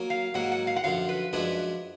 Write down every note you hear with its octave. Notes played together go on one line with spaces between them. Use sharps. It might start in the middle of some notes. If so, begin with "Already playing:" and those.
Already playing: F#3 A#3
F5
G#2 F#3 A#3 F#5
F#5
F5
F#5
F#2 D3 F3 F5
B4
F#2 F3 G#3 D4 G#4 B4